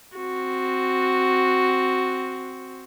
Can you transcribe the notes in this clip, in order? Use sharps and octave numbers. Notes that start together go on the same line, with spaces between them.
C4 F#4